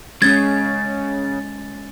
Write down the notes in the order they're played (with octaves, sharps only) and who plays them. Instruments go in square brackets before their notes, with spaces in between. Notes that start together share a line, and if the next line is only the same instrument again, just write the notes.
[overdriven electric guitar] C#3 [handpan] G#3 C#4 [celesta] G#6 [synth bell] A6